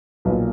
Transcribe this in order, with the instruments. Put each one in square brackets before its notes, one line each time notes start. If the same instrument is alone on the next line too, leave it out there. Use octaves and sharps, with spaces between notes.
[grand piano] B1 A#2 B4